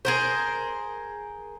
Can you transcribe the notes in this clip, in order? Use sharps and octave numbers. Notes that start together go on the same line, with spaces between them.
G#4 A#4 C5